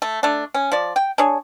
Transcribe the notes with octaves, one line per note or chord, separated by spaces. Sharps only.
A3
A3 D4
C#4
F3 D5
G5
D4 G#4 C#5